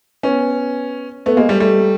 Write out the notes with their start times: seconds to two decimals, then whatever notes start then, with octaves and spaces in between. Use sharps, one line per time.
0.23 B3 C#4
1.26 A3 B3
1.37 G#3 A#3
1.49 G3 A3
1.60 G3 A3